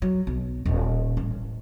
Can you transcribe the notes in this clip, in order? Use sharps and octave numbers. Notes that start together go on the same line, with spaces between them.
F#3
B1
D#1
A1